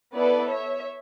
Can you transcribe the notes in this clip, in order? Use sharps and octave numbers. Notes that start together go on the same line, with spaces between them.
B3 E4 A4 B4 D5
C#5 E5